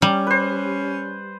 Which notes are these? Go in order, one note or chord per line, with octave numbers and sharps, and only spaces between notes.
G3 C#4
B4 C5